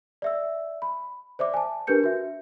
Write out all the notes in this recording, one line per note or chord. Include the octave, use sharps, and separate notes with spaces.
D5 E5 E6
B5
C5 D5 E5 D6
G#5 A5
D4 G4 A#4 B4 G6 C#7
F#4 E5